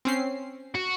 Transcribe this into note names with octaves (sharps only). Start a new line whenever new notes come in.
C4 C#4 C7
F#4